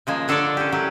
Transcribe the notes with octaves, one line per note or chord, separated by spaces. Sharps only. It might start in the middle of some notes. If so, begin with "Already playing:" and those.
C#3 F3 G#3 A#3
D3 D4 A4 A#4 C#5 D5
C#4 G4
E3 F#3 G4